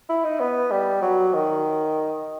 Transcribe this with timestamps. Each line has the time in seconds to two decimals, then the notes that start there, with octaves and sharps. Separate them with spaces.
0.09 E4
0.24 D#4
0.40 B3
0.71 G3
1.02 F#3
1.33 D#3